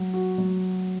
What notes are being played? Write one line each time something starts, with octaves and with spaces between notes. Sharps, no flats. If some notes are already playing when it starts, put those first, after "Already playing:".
Already playing: F#3
F#4
F#3